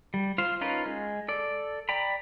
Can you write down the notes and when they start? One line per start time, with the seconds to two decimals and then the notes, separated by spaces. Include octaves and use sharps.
0.14 G3
0.38 F4 C5 F5
0.61 C#4 D#4 F4 A#4 B4
0.86 G#3
1.28 A4 D5
1.89 D5 G5 A#5 B5